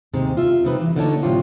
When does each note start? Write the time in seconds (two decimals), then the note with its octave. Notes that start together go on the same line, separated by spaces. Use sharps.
0.13 D#2 G#2 C3 G#3 D#4
0.37 F4 E5
0.64 C3 G3 D#4 B4
0.80 E3
0.96 D2 D3 A#3 D#4 C#5 A5
1.22 A2 C3 F#3 F4 G4